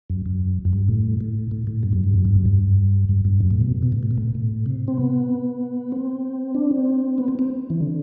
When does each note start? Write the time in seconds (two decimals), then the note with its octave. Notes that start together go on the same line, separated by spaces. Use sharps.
0.10 F#2
0.26 F#2
0.65 F#2
0.73 G2
0.88 A2
1.21 A2
1.51 A2
1.67 A2
1.83 G2
1.93 F#2
2.04 G2
2.14 F#2
2.25 G2
2.35 F#2
2.46 G2
3.09 G2
3.25 G2
3.40 F#2
3.51 A2
3.61 B2
3.83 B2
3.92 A2
4.03 A2
4.11 B2
4.18 A2
4.35 A2
4.66 C3
4.88 C4
4.97 B3
5.92 C4
6.55 D4
6.71 C4
7.18 B3
7.28 C4
7.39 C4
7.70 E3
7.80 D3